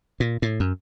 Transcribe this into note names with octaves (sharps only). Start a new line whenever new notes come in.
A#2
A2
F#2